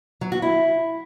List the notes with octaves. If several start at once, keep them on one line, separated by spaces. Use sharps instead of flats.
F#3
F#4
E4